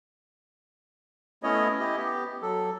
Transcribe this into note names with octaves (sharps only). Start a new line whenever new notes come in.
A3 B3 C#4 E4 C#5 D#5
E4 G4 D#5
B3 G4
F#3 A4